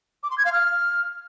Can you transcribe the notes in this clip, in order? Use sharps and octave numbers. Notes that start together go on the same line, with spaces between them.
D6
C6
G#6
F5
F6